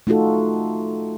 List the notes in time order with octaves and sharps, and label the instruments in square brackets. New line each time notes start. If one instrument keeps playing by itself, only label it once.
[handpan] A3 D#4 F4 F#4 A4